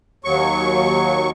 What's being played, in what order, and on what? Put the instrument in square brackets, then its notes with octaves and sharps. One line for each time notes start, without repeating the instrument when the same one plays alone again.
[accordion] D#2 F#3 C#6